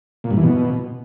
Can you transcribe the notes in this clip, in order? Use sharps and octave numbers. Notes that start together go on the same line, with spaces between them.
A#2
G2
E3
B2